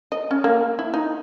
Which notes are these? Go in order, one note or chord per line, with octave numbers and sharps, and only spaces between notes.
D#5
C#4
A#3
E4
D#4